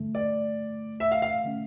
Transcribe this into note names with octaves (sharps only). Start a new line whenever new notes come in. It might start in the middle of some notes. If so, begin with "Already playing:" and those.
Already playing: G2 D3 A3
D5
E5
F5
F5
D3 A3 C#4